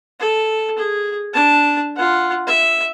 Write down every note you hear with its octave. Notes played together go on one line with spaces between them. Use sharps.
A4
G#4
D4 A5
F4 F#5
E5